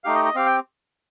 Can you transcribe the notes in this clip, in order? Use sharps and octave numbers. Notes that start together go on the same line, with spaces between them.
A3 D#4 G4 F5
D#5
D#5
C4 G4 F5
G5